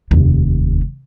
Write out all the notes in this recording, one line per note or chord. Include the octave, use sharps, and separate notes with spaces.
F1 D#2